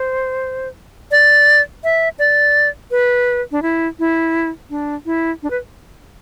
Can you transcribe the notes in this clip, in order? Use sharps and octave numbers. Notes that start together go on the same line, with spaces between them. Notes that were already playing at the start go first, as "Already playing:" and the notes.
Already playing: C5
D5
E5
D5
B4
D4
E4
E4
D4
E4
D4
B4